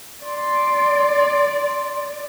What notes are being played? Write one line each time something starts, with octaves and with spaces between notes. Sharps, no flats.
D5 C6